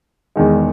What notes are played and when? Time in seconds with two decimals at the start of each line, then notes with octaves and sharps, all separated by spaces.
0.36 E1 E2 D#3 G#3